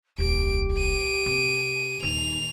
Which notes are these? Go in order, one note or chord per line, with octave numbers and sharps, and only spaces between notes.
D#1 C2 G4 D7
D7 D#7
C3
D#1 D#3 F7